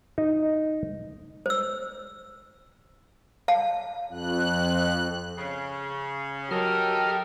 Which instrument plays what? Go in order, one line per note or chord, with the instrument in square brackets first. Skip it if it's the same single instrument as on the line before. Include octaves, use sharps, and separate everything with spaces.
[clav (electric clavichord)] D#4
[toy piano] C5 E6
F5 A5
[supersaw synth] F2 F#6
[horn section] C#3
[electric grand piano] F#3 [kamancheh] G4 [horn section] A4 A#4 [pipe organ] D#5 F6